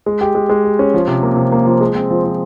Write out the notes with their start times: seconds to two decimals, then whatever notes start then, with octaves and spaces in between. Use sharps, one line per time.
0.06 G#3
0.21 G4
0.35 G#3
0.49 G#3
0.64 G4
0.79 C#4
0.94 F3
1.07 C3
1.23 A#3
1.37 C3
1.52 A#3
1.66 F3
1.81 G#3
1.95 C4
2.10 F3
2.24 F3